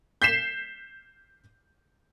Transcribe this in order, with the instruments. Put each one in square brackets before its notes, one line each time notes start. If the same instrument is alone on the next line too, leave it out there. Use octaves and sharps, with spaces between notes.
[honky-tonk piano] G6 B6 C7 E7